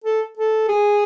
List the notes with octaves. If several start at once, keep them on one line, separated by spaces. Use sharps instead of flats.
A4
A4
G#4